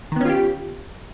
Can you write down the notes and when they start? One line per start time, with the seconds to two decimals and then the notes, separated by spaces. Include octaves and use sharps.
0.12 D#3
0.16 B3
0.21 C#4
0.25 F4
0.30 G4